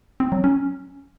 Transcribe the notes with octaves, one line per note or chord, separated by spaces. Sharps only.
C4
F#3
C#4